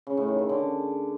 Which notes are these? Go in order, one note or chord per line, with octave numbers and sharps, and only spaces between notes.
C#3
A2
D#3
C#3
D3